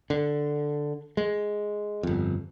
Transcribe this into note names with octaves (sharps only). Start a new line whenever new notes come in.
D3
G#3
G1 F2